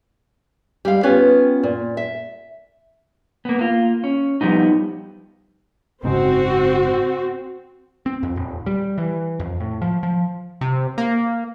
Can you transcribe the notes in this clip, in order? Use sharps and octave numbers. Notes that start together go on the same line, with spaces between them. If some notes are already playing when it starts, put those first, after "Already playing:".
G3 G#3 F5
B3 C#4 F4 G4 B4 C#5
A#2
E5
A#3 B3
A#3 F4
C#4
F3 G3 B3 D#4
F#1 G#2 C#3 C4 F#4
C4
F2
D#1
G3
E3
F2
A2
F3
F3
C3
A#3